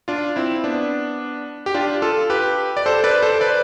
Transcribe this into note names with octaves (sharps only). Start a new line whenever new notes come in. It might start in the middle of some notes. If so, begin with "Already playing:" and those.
D4 F4
C4 E4
B3 D4
G4
D4 F4
F4 A4
G4 B4
D5
A4 C5
B4 D5
A4 C5
B4 D5